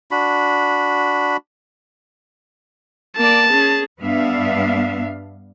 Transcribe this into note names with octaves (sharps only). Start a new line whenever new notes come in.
D4 F#4 B5
A#3 D5 A5
C#4 G#4
G2 B3 D4 E5 F5